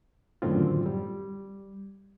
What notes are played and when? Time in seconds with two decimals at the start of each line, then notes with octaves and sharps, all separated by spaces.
0.42 F#2 A2 D3 D#3 C4 F4
0.86 G3